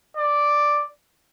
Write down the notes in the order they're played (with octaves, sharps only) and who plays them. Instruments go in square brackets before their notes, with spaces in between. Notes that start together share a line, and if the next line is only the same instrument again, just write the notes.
[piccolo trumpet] D5